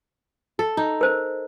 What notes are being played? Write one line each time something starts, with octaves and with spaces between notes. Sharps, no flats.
A4
D#4
A#4 C5